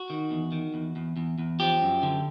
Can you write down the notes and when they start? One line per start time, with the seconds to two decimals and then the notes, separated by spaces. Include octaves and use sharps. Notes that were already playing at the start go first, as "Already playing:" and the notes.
Already playing: F#4
0.10 D#3
0.31 E2
0.52 D#3
0.74 E2
0.96 E2
1.17 E2
1.38 E2
1.60 F3 G4
1.82 F#2
2.03 D3